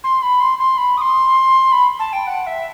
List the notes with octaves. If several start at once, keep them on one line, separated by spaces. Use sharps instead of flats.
C6
B5
C6
C6
B5
D#6
C6
B5
A5
G5
F#5
E5